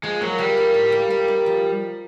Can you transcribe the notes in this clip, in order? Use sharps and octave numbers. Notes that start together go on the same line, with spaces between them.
F3 G#3
F#3 A#3
G3 A#3
A#3
A2
A#3
A#3
D#4
F3